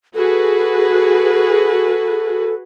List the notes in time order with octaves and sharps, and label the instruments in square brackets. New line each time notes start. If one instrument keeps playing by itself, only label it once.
[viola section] F#4 G#4 B4 [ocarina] A4